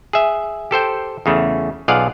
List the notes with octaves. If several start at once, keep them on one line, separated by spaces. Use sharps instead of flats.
G#4 E5
G4 A4 C5 G5
E2 C#3 A3
B1 F4 G#4 D5 F5 F#5